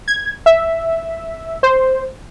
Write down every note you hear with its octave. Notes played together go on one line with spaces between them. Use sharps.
G#6
E5
C5